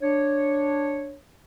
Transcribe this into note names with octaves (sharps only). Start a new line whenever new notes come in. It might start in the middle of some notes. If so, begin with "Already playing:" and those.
D4 C#5